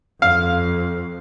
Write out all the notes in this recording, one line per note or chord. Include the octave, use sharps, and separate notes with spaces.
F2 F5